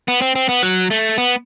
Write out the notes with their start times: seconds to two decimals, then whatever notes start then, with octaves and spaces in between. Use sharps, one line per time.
0.08 B3
0.22 C4
0.35 C4
0.49 B3
0.63 F#3
0.91 A3
1.18 B3